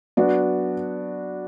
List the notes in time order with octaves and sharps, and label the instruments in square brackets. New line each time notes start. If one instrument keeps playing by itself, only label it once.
[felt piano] F#3 B3 D4 F#4